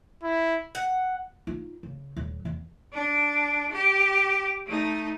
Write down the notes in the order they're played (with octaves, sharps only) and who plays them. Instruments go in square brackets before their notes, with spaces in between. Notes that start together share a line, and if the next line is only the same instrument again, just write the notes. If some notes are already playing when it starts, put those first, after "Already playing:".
[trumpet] E4
[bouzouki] F#5
[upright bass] D#4 F4
C#3
D#1
E2
[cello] D4
G4
A3 D#4